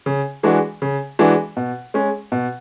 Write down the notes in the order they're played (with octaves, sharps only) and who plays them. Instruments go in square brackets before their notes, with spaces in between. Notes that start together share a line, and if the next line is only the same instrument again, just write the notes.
[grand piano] C#3
E3 G#3 D4 F#4
C#3
E3 G#3 D4 F#4
B2
G#3 C#4
B2